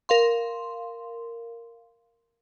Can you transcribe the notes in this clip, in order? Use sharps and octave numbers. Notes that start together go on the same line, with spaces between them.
A#4 F5 C6